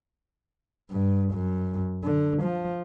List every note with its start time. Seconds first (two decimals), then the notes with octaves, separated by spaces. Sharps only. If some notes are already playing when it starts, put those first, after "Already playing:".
0.90 G2
1.34 F#2
2.04 D3
2.43 F3